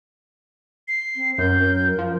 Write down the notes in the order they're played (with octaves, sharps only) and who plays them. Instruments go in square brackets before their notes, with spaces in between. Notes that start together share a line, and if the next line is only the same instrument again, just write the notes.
[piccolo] C7
[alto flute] C4
[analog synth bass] F#2 [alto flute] A#4 [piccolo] G6
[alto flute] A#4
[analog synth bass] F3